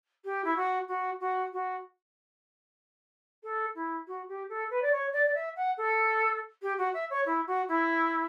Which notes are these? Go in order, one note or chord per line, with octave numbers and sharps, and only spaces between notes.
G4
E4
F#4
F#4
F#4
F#4
A4
E4
F#4
G4
A4
B4
D5
C#5
D5
D5
E5
F#5
A4
G4
F#4
E5
C#5
E4
F#4
E4